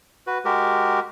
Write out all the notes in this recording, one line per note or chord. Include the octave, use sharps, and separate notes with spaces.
F#4 B4
G#3 F#4 G4 A#4